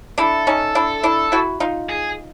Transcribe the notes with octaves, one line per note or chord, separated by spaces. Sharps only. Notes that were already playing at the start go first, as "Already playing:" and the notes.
D4 E4 A4
C#4 D#4
D4 E4
D4 E4
E4 F#4
D#4 F4
G#4